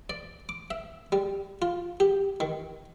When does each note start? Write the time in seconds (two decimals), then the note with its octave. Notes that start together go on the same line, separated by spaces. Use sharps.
0.10 D5
0.49 D6
0.71 E5
1.12 G3
1.62 F4
2.00 G4
2.40 D#3